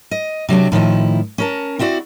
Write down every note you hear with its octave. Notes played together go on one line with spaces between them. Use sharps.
D#5
C3 F#3 C4 D4
A2 D#3 F3 E4
C#4 A#4 A5
C4 E4 F#4 D5